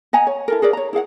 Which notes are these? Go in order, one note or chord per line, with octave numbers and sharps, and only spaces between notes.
D#5 F#5 G#5 A#5
C#5
E4 A4 A#4
G#4 A#4 B4 D5
C#5 A#5
E4 G#4 F5 F#5